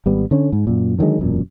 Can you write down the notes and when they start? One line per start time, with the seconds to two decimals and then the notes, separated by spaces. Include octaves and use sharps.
0.06 G#1 G3 B3
0.31 D3 C#4
0.52 G#2
0.67 F#2 A#2
0.99 D3 D#3 F#3 G#3
1.19 E1 F#2 A#2